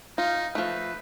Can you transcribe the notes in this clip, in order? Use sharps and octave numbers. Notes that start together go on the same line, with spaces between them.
D#4 F4
F3 A3 B4